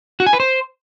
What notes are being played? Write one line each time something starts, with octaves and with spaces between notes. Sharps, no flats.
F#4
G#5
B4
C5